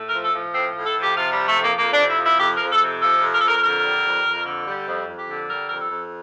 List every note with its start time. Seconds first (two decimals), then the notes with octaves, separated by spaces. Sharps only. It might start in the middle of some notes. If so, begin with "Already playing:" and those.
Already playing: A2
0.08 A#4
0.14 F3
0.24 A4
0.34 F3
0.54 A2 C4
0.75 A2
0.86 A4
0.96 F3
1.01 G4
1.16 C3 F4
1.33 F3 G3
1.48 A3
1.58 F2 A#3
1.78 F2 A#3
1.93 D4
1.99 C3
2.09 E4
2.19 F3
2.24 E4
2.40 F2 G4
2.56 A#4
2.61 F2
2.71 A4
2.81 C3
3.02 F3 A4
3.22 F2
3.33 A#4
3.41 F2 A4
3.48 A#4
3.63 D3 A#4
3.83 G3
4.05 F2
4.25 F2
4.46 D3
4.67 G3
4.88 F2
5.08 F2
5.18 G4
5.28 D3
5.49 G3 A#4
5.69 F2 A#4
5.80 A4
5.90 F2